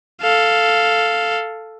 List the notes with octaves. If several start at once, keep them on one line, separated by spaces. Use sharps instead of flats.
A4 F5